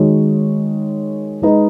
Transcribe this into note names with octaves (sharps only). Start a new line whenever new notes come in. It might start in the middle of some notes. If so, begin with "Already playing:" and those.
Already playing: D#3 G#3 D#4 F#4 C#5
G#3 D#4 B4 D#5